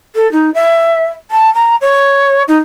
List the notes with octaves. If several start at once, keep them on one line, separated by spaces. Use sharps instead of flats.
A4
D#4
E5
A5
A#5
C#5
D#4